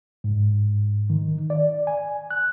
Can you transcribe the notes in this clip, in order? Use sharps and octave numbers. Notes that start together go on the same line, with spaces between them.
G#2
D#3
D5
G#5
F#6